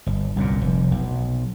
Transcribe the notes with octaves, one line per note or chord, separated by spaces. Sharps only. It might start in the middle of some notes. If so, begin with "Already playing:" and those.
G1
C2 F#2 A#2
F1
B1